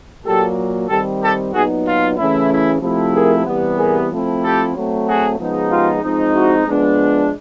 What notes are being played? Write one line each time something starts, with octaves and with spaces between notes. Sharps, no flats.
A#2 F#3 A#3 G4 A4
D#3 G3 C4 G4 A4
G4 A4
A#2 F#3 B3 D#4 F#4 G#4
F4
C#3 E3 A3 C#4 E4
E4
C3 F3 A3 C4 E4
G#4 A#4
C3 E3 G3 B3
G#4 A#4
F3 A3 C4 E4
G4 A4
F#3 A3 C4
F#4 G#4
C#3 F3 G#3 B3 D#4
F4 G4
F3 G#3 C4 D#4
E4 F#4
F3 G#3 B3 D4